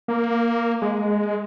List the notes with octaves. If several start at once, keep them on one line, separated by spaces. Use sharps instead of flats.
A#3
G#3